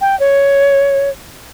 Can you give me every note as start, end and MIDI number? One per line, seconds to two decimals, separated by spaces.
0.01 0.18 79
0.20 1.09 73